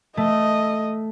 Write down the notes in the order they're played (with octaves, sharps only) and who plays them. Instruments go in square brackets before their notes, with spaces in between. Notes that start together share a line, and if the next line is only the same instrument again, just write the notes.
[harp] A3 [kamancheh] D#5